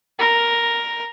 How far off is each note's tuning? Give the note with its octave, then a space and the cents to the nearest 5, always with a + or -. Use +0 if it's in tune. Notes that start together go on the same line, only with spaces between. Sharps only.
A#4 +5